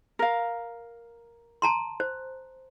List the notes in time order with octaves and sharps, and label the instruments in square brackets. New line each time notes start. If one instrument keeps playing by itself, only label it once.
[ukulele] A#4 F5
[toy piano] A5 A#5 C6
C5